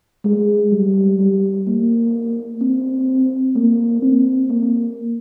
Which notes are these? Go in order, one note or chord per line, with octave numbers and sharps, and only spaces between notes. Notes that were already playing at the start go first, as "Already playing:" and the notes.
G#3
G3
G3
A#3
C4
A#3
C4
A#3